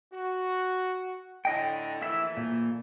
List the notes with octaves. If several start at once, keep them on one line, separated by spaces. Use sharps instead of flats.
F#4
A2 D3 E4 D#5 G5
A#1 E3 A3 E4 E5
A#2